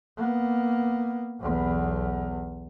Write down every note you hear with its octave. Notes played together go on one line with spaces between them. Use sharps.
A#3 B3
B1 E2